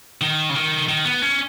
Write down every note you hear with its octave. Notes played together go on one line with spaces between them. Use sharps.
D#3
C#3
D#3
D#3
B3
C#4